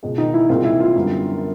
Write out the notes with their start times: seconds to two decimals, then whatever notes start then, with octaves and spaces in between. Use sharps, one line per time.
0.03 C#2 B2 G#3
0.18 D#3 D#4
0.34 E3 E4
0.49 C2 A#2 F3 G#3 C4 F4
0.64 E3 E4
0.80 F3 F4
0.96 F#2 D3 G3 B3